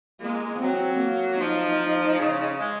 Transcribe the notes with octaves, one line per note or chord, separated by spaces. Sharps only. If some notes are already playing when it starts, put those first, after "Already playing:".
G#3 A#3
F#3 C4
A#3
F3 D#4
C#3
C#3
G#3